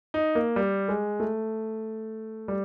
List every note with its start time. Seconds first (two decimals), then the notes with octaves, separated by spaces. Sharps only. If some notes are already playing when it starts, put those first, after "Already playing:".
0.14 D#4
0.35 A#3
0.56 G3
0.88 G#3
1.20 A3
2.48 G3